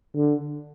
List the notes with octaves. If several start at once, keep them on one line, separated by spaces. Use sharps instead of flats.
D3